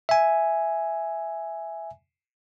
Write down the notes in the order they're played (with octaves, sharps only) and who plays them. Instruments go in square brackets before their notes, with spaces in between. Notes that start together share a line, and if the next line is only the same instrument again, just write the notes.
[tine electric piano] E5 G#5